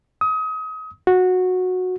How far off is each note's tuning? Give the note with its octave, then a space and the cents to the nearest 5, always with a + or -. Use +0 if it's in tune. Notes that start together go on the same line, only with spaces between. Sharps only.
D#6 +30
F#4 -15